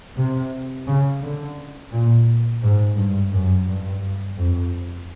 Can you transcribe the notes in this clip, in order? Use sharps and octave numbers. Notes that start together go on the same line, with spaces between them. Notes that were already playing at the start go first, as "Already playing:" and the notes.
C3
C#3
D3
A#2
G#2
G2
F#2
G2
F2